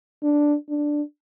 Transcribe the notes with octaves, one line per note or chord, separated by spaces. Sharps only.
D4
D4